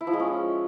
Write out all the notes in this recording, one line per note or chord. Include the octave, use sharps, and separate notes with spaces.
E4
F3
G#3
C#4